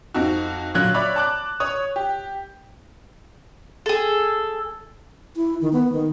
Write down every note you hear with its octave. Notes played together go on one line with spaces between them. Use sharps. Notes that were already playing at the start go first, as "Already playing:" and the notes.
F2 D#4 F#4
A#2 D3 F#3 F#6
C#5 D5 E5 B5 D6
A5 D6 F#6
C#5 D#6
G4
G#4 A4
E4
D#3
B3
D#3